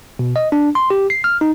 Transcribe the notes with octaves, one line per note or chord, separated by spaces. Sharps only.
B2
D#5
D4
C6
G4
C7
F6
D#4